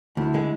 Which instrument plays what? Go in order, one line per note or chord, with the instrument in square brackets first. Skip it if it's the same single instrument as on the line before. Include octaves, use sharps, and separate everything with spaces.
[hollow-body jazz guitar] D2 [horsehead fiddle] E4
[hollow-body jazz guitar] D3 G#3